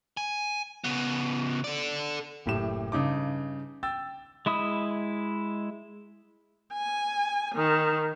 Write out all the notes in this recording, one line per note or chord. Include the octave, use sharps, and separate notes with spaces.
G#5
C#3 B3
A4 D5
F#1 A2 G4 E7
G2 C#3 D#4 D6
G5 E6 A6
G#3 E4 B5 D#6
G#5
D#3